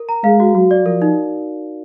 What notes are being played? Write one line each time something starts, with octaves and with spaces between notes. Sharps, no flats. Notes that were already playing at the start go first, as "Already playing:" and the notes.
Already playing: A#4
A#5
G#3 F5
F#4
F#3 F#4
D5
F3 A#4
D#4